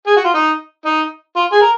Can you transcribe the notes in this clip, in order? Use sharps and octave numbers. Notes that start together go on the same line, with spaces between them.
G#4
F#4
F4
D#4
D#4
F4
G#4
A#4